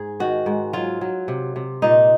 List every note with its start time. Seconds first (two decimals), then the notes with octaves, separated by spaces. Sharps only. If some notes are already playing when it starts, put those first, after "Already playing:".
Already playing: G#2 G#4
0.20 D#3 F#4
0.46 G#2
0.73 F#3 F4
1.01 F#3
1.28 C3
1.56 C3
1.82 A#2 D#4